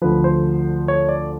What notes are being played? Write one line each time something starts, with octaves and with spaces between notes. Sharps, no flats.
D2 D3 F3 B4
C5
C#5
D5